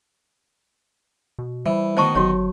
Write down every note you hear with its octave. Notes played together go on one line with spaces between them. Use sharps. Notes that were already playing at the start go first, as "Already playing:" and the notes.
B2
E3 G3 C5
B2 D#3 A3 C5 A5 C#6
G1 F#3 F#4 G4 C#5